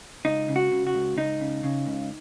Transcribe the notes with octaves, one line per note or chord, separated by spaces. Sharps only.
C#2 D#4
C#3
F#4
C#3
F#4
C#2
C#2 D#4
C#3
C#3
C#2